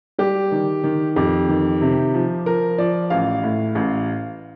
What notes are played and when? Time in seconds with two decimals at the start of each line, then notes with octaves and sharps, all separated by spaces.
0.18 G3 G4
0.52 D#3
0.84 D#3
1.16 F2 G4
1.49 D#3
1.81 C3
2.14 F3
2.46 F3 A#4
2.78 F3 D5
3.10 A1 F5
3.43 A2
3.75 A1